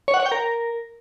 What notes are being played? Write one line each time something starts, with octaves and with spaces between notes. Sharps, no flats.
C#5
F#5
C#5
G5
A#4